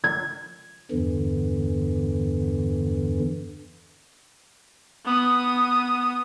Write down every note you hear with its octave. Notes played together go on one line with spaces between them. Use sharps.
G#6
E2 G2 D3 E3
B3 D#6